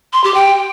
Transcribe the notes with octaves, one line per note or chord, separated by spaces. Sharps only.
C6
G4
G5